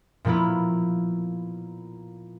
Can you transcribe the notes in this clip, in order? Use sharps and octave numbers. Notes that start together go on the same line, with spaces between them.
A#2 F3 A#3 B3 E4